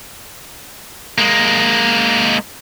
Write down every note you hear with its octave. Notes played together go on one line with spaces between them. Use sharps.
G#3 A#3